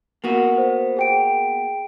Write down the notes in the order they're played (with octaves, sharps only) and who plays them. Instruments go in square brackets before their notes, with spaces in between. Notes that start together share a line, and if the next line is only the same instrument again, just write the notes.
[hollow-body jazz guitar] A#3 B3 F#4
[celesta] C5
G#4 G5 D7